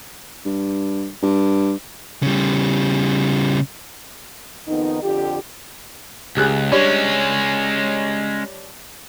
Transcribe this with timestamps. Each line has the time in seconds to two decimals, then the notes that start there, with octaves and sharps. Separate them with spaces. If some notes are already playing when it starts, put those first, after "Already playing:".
0.45 G2
1.22 G2
2.23 C#3 G3
4.68 F2 D#3 B3 D#4
5.03 F2 D3 F4 G4
6.37 C#2 G4 G#4 F#6
6.72 G3 G#3 C#4 D4 C#5